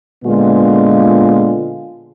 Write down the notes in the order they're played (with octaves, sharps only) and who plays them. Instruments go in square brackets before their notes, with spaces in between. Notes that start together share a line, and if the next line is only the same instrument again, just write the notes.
[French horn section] A#2 D3 G#3 B3 F4